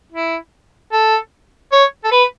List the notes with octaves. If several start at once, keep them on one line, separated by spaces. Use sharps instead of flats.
E4
A4
C#5
A4
B4